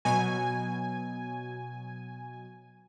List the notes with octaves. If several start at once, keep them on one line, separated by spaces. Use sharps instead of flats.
B2 F#3 G#5